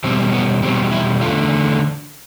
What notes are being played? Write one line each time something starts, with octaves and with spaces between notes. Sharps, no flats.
E2 B2 G3 C4
B3
E2 B2 G3 C4
E4
E2 D3 A3 F4